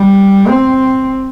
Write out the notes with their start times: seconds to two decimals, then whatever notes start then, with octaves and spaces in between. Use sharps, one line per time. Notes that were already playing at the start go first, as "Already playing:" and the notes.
Already playing: G3
0.48 C4